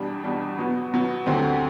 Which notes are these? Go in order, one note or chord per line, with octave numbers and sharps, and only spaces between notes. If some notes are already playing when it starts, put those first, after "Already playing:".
Already playing: E2 B2 G3 D4
E2 B2 G3 D4
B2 F#3 B3
B2 F#3 B3
D2 D3 F#3 C4 G4